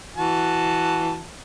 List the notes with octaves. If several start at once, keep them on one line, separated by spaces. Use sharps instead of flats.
E3 F#4 A5